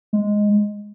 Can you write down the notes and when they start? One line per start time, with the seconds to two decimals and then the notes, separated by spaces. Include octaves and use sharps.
0.13 G#3